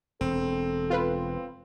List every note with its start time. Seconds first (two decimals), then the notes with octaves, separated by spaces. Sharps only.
0.21 E1 C4 A4
0.90 F4 B4